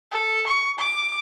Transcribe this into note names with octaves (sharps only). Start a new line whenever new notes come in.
A4
C#6
D6